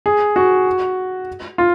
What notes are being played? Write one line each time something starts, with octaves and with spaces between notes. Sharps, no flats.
G#4
F#4
F4